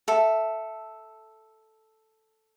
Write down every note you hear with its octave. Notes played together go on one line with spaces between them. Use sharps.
A4 E5